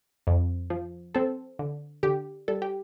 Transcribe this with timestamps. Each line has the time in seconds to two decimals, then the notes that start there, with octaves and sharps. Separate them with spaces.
0.27 F2
0.70 F3
1.15 C4 A4
1.59 D3
2.03 D3 G4
2.48 G3 A4
2.62 G4